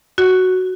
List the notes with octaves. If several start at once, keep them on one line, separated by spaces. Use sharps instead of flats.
F#4